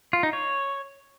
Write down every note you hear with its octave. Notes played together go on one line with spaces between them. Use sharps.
F4
D#4
C#5